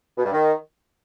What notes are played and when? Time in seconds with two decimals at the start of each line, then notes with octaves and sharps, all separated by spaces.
0.17 B2
0.25 G2
0.33 D#3